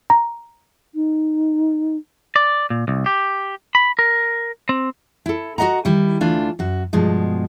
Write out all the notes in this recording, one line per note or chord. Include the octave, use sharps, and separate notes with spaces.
A#5
D#4
D5
A#2
C2
G4
B5
A#4
C4
E4 A4
F#4 G#4 D#5 F#5 A#5
D#3 G3 E4
D2 E3 A3 D4 F4 G#5
F#2 F#4
G2 B2 F3 G#3